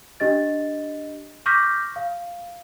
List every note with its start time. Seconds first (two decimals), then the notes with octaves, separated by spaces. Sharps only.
0.20 D4 G4 D#5 A6
1.46 C#6 D6 F6 G6 A#6 B6
1.96 F5